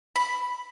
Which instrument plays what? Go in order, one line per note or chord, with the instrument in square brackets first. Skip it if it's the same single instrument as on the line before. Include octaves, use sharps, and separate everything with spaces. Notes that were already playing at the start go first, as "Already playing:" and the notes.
[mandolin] B5